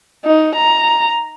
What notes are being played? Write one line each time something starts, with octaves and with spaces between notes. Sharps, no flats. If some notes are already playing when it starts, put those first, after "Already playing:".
D#4
A#5